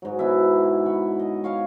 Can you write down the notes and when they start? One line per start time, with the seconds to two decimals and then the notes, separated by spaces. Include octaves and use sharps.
0.02 G#2 F#3
0.19 B2 E4 F#4 E5
0.86 B5 C#6
1.19 D#5
1.44 C#5 F5 C#6